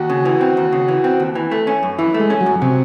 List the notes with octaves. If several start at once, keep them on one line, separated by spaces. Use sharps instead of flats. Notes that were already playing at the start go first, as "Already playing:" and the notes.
Already playing: D#2 F#4
C#3
E3
C4
D#2
C#3
E3
C4
D#2
E3
A3
C#4
F#2
E3 E4
A3
G#3
C#4
F#3
F#2
C3 F#3